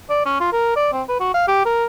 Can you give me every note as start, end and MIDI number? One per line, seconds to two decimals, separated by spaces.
0.10 0.24 74
0.26 0.40 61
0.40 0.52 65
0.53 0.76 70
0.76 0.89 74
0.93 1.03 60
1.09 1.16 71
1.20 1.32 66
1.34 1.45 77
1.48 1.64 67
1.66 1.85 70